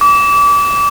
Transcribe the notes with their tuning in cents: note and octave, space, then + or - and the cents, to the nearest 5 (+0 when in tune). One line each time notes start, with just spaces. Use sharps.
D6 -30